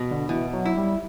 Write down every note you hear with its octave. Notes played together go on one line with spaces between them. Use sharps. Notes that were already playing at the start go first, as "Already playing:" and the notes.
Already playing: B2
D3
B2 E3
F#3
E4
G3